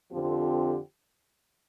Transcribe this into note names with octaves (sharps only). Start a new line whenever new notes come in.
F2 D3 F3 C4 G4